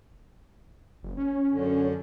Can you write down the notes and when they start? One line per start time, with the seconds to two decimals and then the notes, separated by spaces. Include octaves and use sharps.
1.03 F#1
1.17 C#4
1.51 F#2 D3